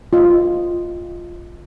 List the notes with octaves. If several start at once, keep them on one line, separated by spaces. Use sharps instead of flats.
F4 D#5